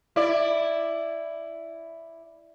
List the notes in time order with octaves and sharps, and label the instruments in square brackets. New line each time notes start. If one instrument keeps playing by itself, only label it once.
[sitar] E4 D5